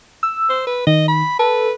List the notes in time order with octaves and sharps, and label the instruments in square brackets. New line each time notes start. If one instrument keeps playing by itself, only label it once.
[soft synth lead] E6
[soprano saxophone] C5
B4
[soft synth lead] D#3 [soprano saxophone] D#5
[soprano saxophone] B5
[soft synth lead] A4 [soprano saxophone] B4